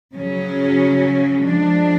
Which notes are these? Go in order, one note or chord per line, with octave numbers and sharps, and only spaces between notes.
C#3 F#3 C#4
F3 G#3 D4